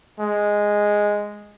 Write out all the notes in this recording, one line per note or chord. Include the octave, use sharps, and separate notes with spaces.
G#3